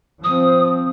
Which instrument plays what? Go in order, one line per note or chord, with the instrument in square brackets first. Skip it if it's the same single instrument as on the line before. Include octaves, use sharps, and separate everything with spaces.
[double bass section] F3 C4 [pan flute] D#6